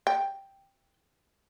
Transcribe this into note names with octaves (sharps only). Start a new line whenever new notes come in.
G5